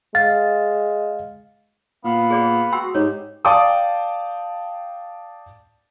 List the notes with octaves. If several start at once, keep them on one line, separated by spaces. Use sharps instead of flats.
G#3 F5 A6
A#2 B3 F5
G#4 D5 D6
F#4 G5 C6 E6
G#2 G4 C#5
D5 F5 G5 A5 D6 D#6